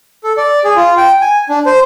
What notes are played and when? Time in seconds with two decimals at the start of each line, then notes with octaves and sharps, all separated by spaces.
0.24 A4
0.37 D5
0.64 G#4
0.76 F4
0.97 G5
1.21 G#5
1.49 D4
1.66 C5